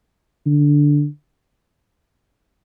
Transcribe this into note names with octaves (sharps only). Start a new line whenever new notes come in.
D3